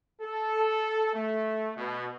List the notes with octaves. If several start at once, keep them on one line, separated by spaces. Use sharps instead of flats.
A4
A3
B2